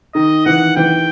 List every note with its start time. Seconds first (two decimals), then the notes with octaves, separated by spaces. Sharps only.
0.14 D#3 D#5
0.46 E3 F#5
0.77 E3 G5